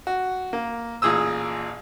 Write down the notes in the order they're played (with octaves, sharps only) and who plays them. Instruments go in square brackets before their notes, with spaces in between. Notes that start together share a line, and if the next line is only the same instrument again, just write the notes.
[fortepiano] F#4
A#3
A1 A#2 G#4 D#6 E6